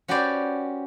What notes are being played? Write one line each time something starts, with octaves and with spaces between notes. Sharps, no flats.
C#4 F#4 G4 B4 C5 D5